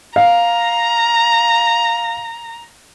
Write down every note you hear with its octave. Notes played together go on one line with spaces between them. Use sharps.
F5 A#5